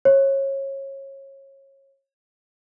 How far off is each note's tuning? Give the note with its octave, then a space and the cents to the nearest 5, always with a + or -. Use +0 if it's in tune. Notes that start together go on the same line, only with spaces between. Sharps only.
C#5 -25